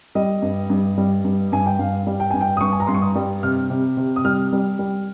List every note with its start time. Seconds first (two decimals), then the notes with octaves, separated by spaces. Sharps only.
0.15 G3 D#5
0.42 G2
0.70 G2
0.98 G3
1.24 G2
1.52 G2 G#5
1.66 G5
1.79 G2 F5
2.07 G3
2.20 G5
2.31 G2 G#5
2.41 G5
2.57 D#6
2.61 G2 C#6
2.73 G#5
2.80 A#5
2.87 G2 C6
2.95 C#6
3.02 D#6
3.15 G3
3.43 C3 F6
3.70 C3
3.97 C3
4.16 D#6
4.25 G3 F6
4.53 G3
4.79 G3